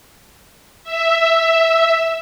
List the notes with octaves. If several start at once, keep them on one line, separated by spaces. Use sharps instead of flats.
E5